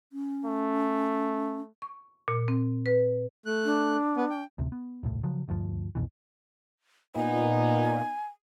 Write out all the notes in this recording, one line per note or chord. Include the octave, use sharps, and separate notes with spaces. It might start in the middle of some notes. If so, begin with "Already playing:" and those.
C#4
A3
C#6
A#2
C4
B4
A3 F#6
D4
B3
G5
A1 D2 C3
B3
D#1 C2 A2
C#3 F3 F#3
D#1 D2 G2 F3
C2 F2 B2 E3
A#2 B3 D#4 G#5